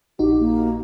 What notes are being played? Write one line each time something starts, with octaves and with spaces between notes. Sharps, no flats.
A#1 D#4 F#4 G4
A#3